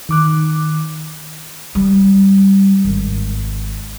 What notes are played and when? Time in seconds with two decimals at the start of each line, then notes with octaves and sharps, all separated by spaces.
0.09 D#3 D6 F#6
1.75 G3
2.84 G#1